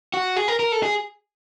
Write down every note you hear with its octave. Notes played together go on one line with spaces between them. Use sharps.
F#4
G#4
A#4
A#4
A4
G#4